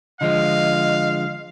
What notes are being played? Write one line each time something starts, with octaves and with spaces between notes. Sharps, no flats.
D3 F3 G#3 D#5 F5